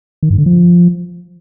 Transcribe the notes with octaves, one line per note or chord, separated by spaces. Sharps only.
D#3
G2
D3
F3